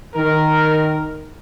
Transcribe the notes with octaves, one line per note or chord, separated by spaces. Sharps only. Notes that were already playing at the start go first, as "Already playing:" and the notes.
D#3 A#4